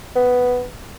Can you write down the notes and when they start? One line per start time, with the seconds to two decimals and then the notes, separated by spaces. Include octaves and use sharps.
0.16 B3